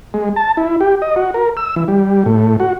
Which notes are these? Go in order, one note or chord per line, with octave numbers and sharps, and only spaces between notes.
G#3
A5
E4
G4
D#5
F#4
A#4
E6
E3
G3
A2
F#4